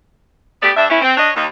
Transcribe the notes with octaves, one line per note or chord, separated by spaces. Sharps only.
A3 B3 G4 D5
G2 D4 E5
B3 C#4 E4
C4
D4 C#5 D#5
D#2 D#4